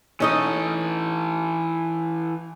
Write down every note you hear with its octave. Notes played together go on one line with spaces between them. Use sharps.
E3 C#4 D#4 A4 D#5